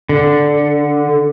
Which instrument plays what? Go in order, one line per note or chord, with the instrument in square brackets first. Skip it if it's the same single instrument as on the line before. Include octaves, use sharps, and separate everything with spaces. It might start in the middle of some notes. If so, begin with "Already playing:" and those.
[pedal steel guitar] D3